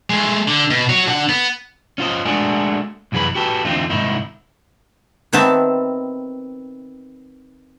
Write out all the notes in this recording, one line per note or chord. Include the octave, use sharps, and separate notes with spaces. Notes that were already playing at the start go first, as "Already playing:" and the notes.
G#3 A3
D3
B2
F#4 C#5
D3 F#5
B3
C#4 F4 C5 D#5
G#3 A3 D4 F#4 G#4 A#4
C2 F#2 E3 G#4 B4 B5
F#4 G4 A4 B4
E2 D3 A3 C4 D#4 F4
C2 G#2 D#3 D#4 E4
D#3 B3 C4 E5 A5